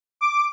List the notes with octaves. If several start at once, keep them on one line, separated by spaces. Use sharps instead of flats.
D6